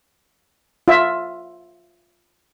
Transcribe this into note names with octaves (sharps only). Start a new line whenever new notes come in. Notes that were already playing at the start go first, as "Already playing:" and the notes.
F4 E5